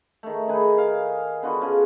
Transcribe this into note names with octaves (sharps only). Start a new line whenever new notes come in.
D#3 A3
D#3 D#4 G#4 B4
F5
D3 B3 F4 F#4
C#3 G#5